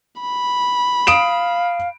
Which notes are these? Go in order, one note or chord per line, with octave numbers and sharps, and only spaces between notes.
B5
F5 D#6 D7 E7